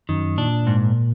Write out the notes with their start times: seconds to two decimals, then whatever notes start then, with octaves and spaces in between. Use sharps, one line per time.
0.09 F#2 D#3
0.38 A#2 D4
0.67 G#2